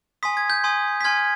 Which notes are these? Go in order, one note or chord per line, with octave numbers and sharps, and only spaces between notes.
G#5 C6 D#6 B6
G#6
G6
G#5 C6 D#6
B6
G#5 C6 F6 G#6